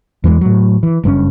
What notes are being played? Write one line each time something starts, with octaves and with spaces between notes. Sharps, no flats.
E2 E3 F#3 G#3
A2 F#3
E3
F#1 G2 A#2 C#4